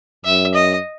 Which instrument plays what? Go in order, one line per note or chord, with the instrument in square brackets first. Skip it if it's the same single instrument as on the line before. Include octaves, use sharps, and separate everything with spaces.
[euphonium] F#2 [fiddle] E5
[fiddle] D#5